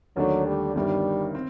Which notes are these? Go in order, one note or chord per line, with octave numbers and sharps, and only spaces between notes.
D#2 D3 F#3 A3 D4
G3
G1 G2 D#3 G3
C4